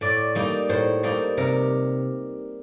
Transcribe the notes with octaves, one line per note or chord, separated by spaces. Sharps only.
A2 D5
G3 A#3 D#4
A2 C5
G3 A#3 D#4
C3 A#4